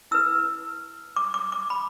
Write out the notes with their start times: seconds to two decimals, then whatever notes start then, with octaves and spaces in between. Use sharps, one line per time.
0.11 E4 B4 E6
1.16 D6
1.34 D6
1.52 D6
1.70 B5